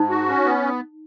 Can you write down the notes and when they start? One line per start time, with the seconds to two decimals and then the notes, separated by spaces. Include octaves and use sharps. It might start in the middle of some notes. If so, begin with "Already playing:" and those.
Already playing: G#2 D#4
0.10 F#4
0.28 C#4
0.45 B3